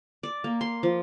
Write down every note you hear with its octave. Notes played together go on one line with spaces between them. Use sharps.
D5
A#3
C6
F3